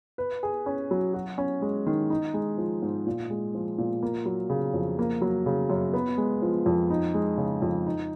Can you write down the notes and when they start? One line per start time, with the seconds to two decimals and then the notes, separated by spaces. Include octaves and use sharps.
0.18 B4
0.43 G#4
0.66 C#4
0.91 F#3
1.14 F#4
1.38 C#4
1.62 G#3
1.86 D#3
2.10 D#4
2.34 G#3
2.58 F3
2.82 G#2
3.07 A#2
3.30 G#3
3.55 F3
3.78 A#2
4.03 A#3
4.26 F#3
4.50 C#3
4.74 F2
4.99 A#3
5.22 F#3
5.46 C#3
5.70 F#2
5.93 B3
6.18 G#3
6.42 F3
6.66 F2
6.90 D#4
7.14 G#3
7.37 C#3
7.62 F2
7.86 D#4